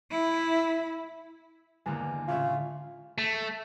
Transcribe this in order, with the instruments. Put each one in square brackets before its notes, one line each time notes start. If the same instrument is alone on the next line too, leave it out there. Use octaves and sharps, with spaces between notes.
[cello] E4
[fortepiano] E2 G2 A#3 [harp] D3 G#3 [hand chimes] G#5
[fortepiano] A1 C#3 E5 [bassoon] F4
[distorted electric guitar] A3